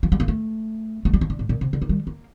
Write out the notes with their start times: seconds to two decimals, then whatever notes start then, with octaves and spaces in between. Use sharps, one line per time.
0.03 F3
0.12 G3
0.20 A#3
0.28 A3
1.05 A3
1.13 G3
1.21 F3
1.30 D3
1.39 A2
1.49 A#2
1.61 C3
1.73 D3
1.82 D#3
1.89 G3
2.07 A#3